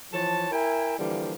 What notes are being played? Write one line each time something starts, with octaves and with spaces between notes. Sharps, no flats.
E3 F3 C#5 A5
E4 A#4 E5 G5 G#5
D3 E3 F3 G3 A#3